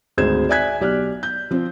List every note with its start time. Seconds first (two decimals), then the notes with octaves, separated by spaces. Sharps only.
0.18 G#1 D2 G#4 C5 G#6 E7
0.49 D5 E5 G#5 F#6 G#6 B6
0.81 B1 G4 D5 F6 F#6
1.23 G6
1.51 F3 C4